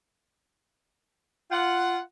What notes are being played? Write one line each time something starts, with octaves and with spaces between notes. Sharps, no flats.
F4 F#5